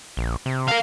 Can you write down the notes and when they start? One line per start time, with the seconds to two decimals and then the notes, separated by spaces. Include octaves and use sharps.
0.17 A#1
0.46 C3
0.68 A#4 F5